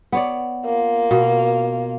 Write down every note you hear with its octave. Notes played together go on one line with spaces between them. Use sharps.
B3 C#5 D5
A#3 F4
B2